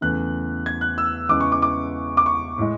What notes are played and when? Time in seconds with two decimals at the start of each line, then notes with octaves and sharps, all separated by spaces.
0.01 E2 C#3 E3 A3 F#6
0.66 G#6
0.81 F#6
0.98 E6
1.29 E2 C#3 E3 G#3 D6
1.41 C#6
1.52 D6
1.62 D6
2.17 D6
2.26 C#6
2.58 A2 G#3